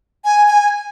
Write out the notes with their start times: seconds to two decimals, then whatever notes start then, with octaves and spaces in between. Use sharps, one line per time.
0.25 G#5
0.48 G#5